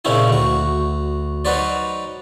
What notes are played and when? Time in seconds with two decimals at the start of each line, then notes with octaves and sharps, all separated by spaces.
0.05 A#2 C#3 C4 C#4 D#4 E4
0.28 D2 F#4
1.45 F#3 D#4 F#4 B4 C5 D5